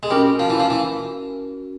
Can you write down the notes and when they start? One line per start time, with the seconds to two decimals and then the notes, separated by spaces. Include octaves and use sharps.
0.03 G#3
0.10 G3 C#4 F#4 A#4
0.39 F3
0.50 E3
0.60 F3
0.70 E3